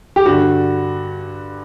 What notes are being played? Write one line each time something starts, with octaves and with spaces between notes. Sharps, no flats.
G4
G2 D3 F#4